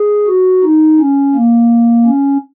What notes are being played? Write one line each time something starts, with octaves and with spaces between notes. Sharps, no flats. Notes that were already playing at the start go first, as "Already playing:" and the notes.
Already playing: G#4
F#4
D#4
C#4
A#3
C#4